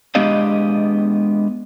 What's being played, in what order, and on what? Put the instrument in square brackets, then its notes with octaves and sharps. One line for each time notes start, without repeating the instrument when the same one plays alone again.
[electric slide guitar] G#3 B3 D4 G4 D#5 F5